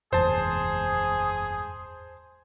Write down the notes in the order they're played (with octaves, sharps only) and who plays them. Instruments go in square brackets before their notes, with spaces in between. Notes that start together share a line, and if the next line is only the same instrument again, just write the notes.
[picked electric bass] F#1 E2 G#2 [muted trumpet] G#4 [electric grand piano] C5 A5